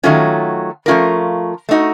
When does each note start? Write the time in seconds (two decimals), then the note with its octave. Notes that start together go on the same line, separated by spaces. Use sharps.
0.03 D#3 F#3 A3 C#4 F4
0.86 F3 A3 C#4 F4 A#4
1.69 A3 D#4 F#4